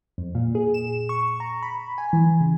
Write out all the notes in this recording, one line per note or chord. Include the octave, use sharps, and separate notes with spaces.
F2
A#2
G#4
E7
C#6
A#5
B5
G#5
E3
C#3